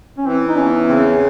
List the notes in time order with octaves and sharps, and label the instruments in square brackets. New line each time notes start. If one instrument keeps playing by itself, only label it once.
[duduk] C#4
[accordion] E3 [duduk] C4
[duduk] D#4
[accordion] E2 [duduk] C#4
[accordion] C#3 [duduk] C4